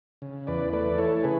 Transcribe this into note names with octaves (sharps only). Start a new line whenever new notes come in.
C#3
E2 B4 D5
A3 B4 D5
E3 A4 C#5
C#3 G#4 B4